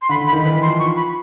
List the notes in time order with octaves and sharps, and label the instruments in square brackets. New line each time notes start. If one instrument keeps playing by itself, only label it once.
[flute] C6
[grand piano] D3 [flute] B5
[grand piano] D3
[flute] B5
[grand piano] D#3
[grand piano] E3 [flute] B5
[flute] C6
[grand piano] F3
[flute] C#6
B5